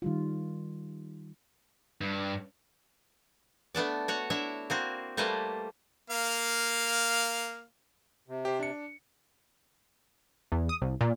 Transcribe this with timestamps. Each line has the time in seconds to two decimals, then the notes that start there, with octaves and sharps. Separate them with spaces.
0.02 D#3 G3 F4
2.01 G2
3.75 A3 B3 D4 D5
4.08 F#4 C#5 F#5
4.30 D4 E4 C#5 E5
4.70 A#3 C4 F#4
5.17 G3 A3 A#3 B4 C5
6.10 A#3 F5
8.28 C3
8.45 G4 C5
8.60 D4 C#7
10.52 E2
10.69 D#6
10.82 C2
11.01 A#2